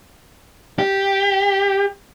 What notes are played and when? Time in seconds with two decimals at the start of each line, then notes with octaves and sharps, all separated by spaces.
0.79 G4